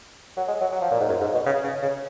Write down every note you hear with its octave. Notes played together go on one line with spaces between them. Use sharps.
F#3
G#3
F#3
F#3
F3
A#2
G#2
F#2
G#2
B2
C#3
C#3
C#3